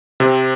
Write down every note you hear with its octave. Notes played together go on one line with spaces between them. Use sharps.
C3 C4